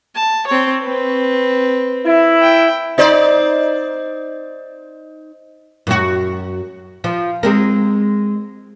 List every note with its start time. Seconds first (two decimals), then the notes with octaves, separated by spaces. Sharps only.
0.15 A5
0.47 C4 C#5
0.82 C4 B4
2.05 E4
2.42 G5
2.98 D#4 C5 D5
5.87 F#2 F#4
7.04 F3
7.43 G#3 C4 A#4